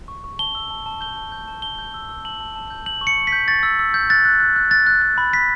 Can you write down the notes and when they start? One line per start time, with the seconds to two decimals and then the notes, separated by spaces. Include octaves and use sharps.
0.08 C#6
0.24 C#6
0.39 A5 G7
0.55 E6
0.70 A5
0.86 A5
1.01 G6 G7
1.17 A5
1.32 G6
1.48 A5
1.62 A5 G7
1.79 G6
1.94 E6
2.09 E6
2.25 A5 F#7
2.40 A5
2.56 A5
2.70 G6
2.86 G6 F#7
3.01 C#6
3.07 C#7
3.17 C#6
3.27 B6
3.32 G6
3.48 C#6 A6
3.63 E6
3.79 E6
3.94 G6
4.10 F#6 A6
4.25 F#6
4.40 F#6
4.56 F#6
4.71 F#6 A6
4.87 F#6
5.02 F#6
5.18 B5
5.33 B5 B6